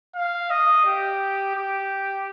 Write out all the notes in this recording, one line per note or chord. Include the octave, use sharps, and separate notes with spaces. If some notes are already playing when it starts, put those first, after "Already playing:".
F5
D#5
G4
G4